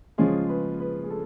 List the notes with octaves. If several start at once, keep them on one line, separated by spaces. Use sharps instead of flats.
C#3 F3 G#3 C#4 F4 G#4
B4
B4
G#4
A4